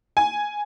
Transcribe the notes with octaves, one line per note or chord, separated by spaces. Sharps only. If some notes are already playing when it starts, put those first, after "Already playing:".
G#5